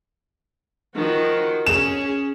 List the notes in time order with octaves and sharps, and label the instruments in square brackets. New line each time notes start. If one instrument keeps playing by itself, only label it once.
[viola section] D#3 F3 F#4
[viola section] C#4 G#4 [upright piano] E7